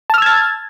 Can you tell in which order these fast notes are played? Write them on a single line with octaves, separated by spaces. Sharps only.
A5 F6 E6 G#6 A6